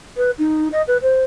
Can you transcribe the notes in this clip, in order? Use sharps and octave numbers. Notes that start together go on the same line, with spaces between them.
B4
D#4
D#5
B4
C5